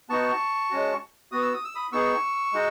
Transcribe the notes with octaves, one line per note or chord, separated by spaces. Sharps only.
B3 D#4 F#4 A5 C#6
G#3 C#4 F#4
B3 F#4 D#6
E6
D#6
E6
B5 D#6
B3 D#4 G#4 C#6 E6
G#3 D#4 F#4